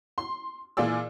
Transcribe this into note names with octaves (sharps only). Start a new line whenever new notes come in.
C6
A#2 E3 F4 G#4 D5 E6